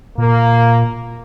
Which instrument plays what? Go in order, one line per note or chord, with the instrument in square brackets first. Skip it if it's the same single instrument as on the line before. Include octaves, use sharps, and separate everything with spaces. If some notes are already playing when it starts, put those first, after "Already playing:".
[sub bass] A#2 [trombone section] A#3